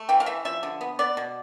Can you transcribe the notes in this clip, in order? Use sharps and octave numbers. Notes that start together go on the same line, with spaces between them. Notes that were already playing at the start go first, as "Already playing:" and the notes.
Already playing: A3
E3 G5
F5
E3 E5
F3 E5
D3
B3
B3 D5
B2